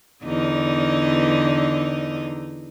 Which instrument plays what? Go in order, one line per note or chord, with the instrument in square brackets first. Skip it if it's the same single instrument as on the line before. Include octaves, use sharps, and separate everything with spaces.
[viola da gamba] E2 D3 D#4